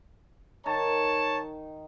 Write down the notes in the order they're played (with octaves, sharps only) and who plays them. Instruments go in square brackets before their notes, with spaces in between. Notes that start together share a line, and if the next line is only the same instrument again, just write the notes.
[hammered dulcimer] D#3 [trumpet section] C#5 A5